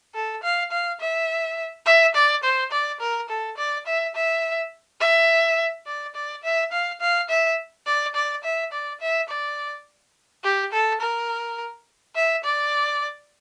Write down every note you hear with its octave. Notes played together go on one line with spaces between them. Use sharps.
A4
F5
F5
E5
E5
D5
C5
D5
A#4
A4
D5
E5
E5
E5
D5
D5
E5
F5
F5
E5
D5
D5
E5
D5
E5
D5
G4
A4
A#4
E5
D5